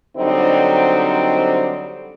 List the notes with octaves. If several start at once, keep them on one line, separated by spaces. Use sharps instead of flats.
D3 F#3 G3 C4 D#4 C5